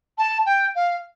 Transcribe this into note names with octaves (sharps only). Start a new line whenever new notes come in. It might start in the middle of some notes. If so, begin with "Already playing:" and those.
A5
G5
F5